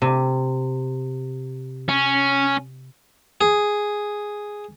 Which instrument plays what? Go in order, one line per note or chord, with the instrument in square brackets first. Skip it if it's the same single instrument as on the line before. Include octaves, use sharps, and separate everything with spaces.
[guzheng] C3
[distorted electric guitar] C#4
[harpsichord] G#4